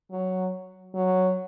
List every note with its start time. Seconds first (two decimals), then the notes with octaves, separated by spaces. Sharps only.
0.11 F#3
0.95 F#3